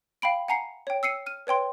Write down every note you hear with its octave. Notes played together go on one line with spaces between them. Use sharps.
F5 G5 B5 D7
F#5 G#5 A#5 C7 C#7
C#5 G5
E6 C7 C#7 D#7
F6 D#7
B4 C#5 G5 C6